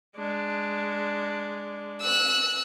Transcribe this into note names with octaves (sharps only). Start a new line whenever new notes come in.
G#3 D4
E6 F#6